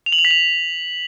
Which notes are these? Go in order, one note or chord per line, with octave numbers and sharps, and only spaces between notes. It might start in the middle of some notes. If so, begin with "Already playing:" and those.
F7
F#7
F7
B6
F7